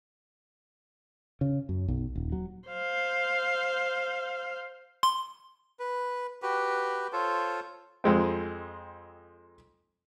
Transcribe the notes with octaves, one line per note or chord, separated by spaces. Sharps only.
C#3
F#2
B1
D#1
F#3
C5 F5
C6
B4
F#4 G4 B4
F4 A4 C5 C#5
F2 G#3 C4